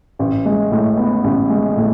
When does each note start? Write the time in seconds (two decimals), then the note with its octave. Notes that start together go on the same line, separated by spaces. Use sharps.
0.19 A1
0.46 G#3
0.71 A2
0.97 B3
1.24 A1
1.50 G#3
1.77 A2